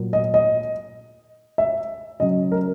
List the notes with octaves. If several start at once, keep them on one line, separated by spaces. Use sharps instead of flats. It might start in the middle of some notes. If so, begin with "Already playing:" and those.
Already playing: A#2 F#3
D#5
D#5
E5
C#3 F#3 D#5
A#4